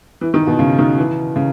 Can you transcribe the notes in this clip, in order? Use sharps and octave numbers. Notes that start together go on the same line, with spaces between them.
E3
D#3
B2
C#3
D#3
E3
C#3